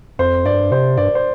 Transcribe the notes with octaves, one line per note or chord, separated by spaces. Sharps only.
F2 C5
G2 D5
C3 C5
G2 D5
C5